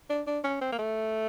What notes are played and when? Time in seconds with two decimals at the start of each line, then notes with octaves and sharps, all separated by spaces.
0.09 D4
0.27 D4
0.44 C#4
0.61 C4
0.72 A#3
0.78 A3